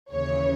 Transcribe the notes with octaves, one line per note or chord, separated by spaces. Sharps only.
D#2 C#3 E3 C#5